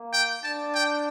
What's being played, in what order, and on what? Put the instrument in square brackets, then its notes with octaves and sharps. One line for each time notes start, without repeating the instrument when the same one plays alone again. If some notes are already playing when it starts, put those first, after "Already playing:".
Already playing: [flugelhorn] A#3
[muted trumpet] G5
[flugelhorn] D4 [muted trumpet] A5
[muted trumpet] G5